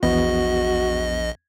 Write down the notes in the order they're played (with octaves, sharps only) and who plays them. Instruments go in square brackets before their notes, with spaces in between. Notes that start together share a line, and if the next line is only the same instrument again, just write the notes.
[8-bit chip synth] A#1 D#5 [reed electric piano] E2 B3 [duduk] F#4